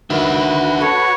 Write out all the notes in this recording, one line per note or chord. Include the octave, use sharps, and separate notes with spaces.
D#3 F#3 D4 F#4 B4 E5
A4 C#5